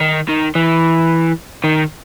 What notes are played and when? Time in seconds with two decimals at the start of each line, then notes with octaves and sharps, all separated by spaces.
0.01 D#3
0.29 D#3
0.55 E3
1.64 D#3